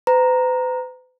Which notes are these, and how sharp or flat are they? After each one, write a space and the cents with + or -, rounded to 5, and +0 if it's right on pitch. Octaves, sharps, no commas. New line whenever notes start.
B4 +45 A#5 +0